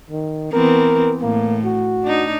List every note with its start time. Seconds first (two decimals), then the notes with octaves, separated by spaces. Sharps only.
0.10 D#3
0.53 E3 B3 C4 A#4
1.22 A2 A#3
1.64 F#4
2.03 D4 D#4